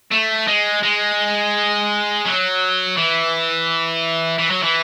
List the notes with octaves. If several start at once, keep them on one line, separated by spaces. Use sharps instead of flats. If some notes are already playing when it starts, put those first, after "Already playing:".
A3
G#3
G#3
F#3
E3
E3
F#3
E3